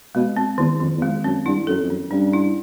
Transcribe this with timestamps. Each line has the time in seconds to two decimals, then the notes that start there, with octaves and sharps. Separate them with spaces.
0.15 B2 G#3
0.36 C4
0.58 E2 D#3
0.80 F2 D#3
0.97 E2
1.02 F2 G#3
1.24 F#2 C4
1.46 G2 E4
1.67 F#2 A4
1.82 F2
1.90 F#2 C#4
2.11 G2 C#4
2.33 E4